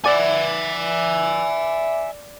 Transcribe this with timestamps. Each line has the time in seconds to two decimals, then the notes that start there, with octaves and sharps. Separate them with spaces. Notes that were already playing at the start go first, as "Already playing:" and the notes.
0.05 D5 E5 F#5 G#5